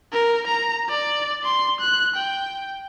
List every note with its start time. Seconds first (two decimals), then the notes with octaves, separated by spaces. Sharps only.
0.13 A#4
0.47 A#5
0.89 D5
1.44 C6
1.81 F#6
2.16 G5